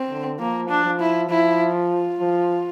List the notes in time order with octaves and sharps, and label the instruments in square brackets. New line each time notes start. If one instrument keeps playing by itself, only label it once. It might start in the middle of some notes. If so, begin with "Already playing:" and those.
Already playing: [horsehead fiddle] C4
[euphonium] D3
[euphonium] F3 [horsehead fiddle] A#3
[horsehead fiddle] D4
[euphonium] F3
[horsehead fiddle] E4
[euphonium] F3 [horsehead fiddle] E4
[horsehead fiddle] F4
[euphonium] F3